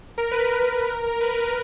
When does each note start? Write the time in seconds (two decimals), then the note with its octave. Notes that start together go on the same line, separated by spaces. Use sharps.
0.18 A#4
0.31 B4
0.45 A#4
1.21 B4